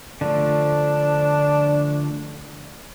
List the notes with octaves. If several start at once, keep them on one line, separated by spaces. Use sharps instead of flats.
D3 F3 A3 D4